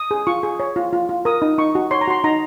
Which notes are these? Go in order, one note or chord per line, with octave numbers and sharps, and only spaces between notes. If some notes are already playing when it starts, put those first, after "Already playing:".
Already playing: D#6
G#4
F4 C#6
G#4
C#5
F4
F4
F4
A#4 D#6
D#4
D#4 C#6
F#4
C#5 C6
A#5
F#4 C6
D#4 A#5